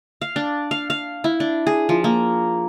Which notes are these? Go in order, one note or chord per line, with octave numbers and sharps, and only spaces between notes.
F5
D4
F5
F5
E4
D4
G#4
F3
A#3